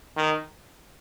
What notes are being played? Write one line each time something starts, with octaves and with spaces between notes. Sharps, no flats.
D#3